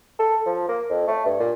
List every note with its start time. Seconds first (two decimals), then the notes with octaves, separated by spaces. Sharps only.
0.19 A4
0.46 F3
0.68 A#3
0.90 F2
1.07 A3
1.25 G2
1.39 A#2